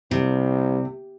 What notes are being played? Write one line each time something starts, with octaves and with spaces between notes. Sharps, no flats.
C2 C3